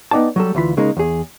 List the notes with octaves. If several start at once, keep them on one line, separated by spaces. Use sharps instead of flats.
B3 D#4 D5 G5 A5
F#3 G3 A4
D2 E3 F4 B5
C#3 G#3 A#3 D#4
E2 G#4